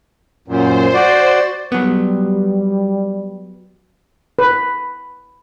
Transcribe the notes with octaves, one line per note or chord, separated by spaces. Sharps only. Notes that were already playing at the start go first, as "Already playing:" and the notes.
F#2 A#2 C5
F#4 D5
F#3 G3 B3
B4